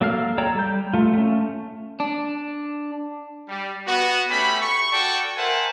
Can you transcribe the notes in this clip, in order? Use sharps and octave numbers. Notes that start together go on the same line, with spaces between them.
F#3 A#3 A4 F5 F6
A4 C#5 D5 G5 A#5
G3 G6
A3 F4
A3 C#4
D4
G3
B3 F#4
A3 C#4 G4 B5
C#6
F#4 A4 D5 G5 A5 C#6
A#4 C5 E5 F#5 G#5 A5